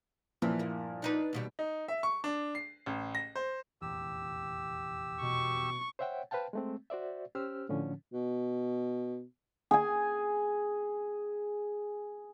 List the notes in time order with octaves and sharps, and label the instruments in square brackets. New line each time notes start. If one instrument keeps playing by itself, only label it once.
[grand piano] A#2 F3 E4 [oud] E3
[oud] G2 A#3
D4 D#4 B4
D#2 B2 G3
[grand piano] D#4
E5
C#6
D4
C7
A1
A#6
C5
[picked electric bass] F1 A#1 E2 [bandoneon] G4 E6
[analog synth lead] B2 [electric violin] C#6
[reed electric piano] C5 C#5 E5 F#5 G5
B4 C5 F5 G5 A5
G#3 A3 C4
F#4 C5 D5 E5
C#4 G4 C5 E6 F6
A2 D3 F3 C#4
[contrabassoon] B2
[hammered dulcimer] G#4 G#5